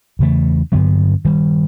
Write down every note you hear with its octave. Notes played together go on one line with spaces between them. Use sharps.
E2 C#3 E3 A3
G2 D3 F#3 B3
G2 D#3 G3